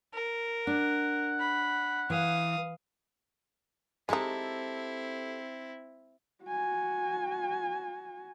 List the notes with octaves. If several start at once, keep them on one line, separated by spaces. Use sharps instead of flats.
A#4
D4 F#5
B5
E3 F5 D#6
G#3 C4 D#4 E4 G4 A4 A5
F#4 G#5